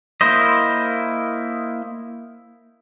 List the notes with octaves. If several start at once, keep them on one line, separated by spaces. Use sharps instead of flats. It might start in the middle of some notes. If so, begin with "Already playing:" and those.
A#3 E4 C5 D#5